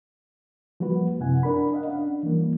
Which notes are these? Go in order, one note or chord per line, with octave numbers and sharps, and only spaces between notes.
F3 G3 A#3 F#4 B4
F#2 C3 E4 F#5 G#5
D4 A#4 B5
D#5 F5 F#5
C#4 D4
E3 G3 A#3